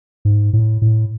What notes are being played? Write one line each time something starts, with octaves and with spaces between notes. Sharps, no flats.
G#2
A2
A2